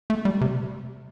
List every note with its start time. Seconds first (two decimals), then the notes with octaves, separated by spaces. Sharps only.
0.10 A3
0.25 G3
0.41 C3